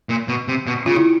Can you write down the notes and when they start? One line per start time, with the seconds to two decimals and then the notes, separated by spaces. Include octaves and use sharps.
0.09 A#2
0.28 B2
0.48 C3
0.67 B2
0.86 C#3 F4
0.96 E4